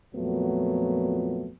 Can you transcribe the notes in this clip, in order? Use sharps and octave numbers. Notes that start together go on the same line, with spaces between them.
F2 A#2 F#3 A3 B3